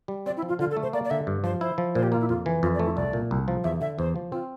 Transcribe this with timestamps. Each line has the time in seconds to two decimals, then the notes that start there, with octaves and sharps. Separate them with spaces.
0.08 G3
0.26 C4 D5
0.37 E4
0.42 F3
0.49 F4
0.59 D3 F4
0.71 A4
0.77 A3
0.83 C5
0.93 A#3 D5
1.05 D5
1.10 D3 E5
1.27 G2
1.44 F3 C5
1.61 E4 C5
1.78 F3
1.95 A#2 C5
2.03 G4
2.12 A#3 F4
2.21 E4
2.29 F2 F4
2.46 E3
2.62 F2 F4
2.74 D5
2.79 A3
2.85 E4
2.96 C2 D5
3.13 A#2
3.31 C2
3.48 F3
3.64 E2 E5
3.81 D3 E5
3.99 E2 C5
4.16 F3
4.32 C4 F4